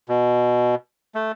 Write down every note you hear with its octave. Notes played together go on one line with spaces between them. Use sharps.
B2
A3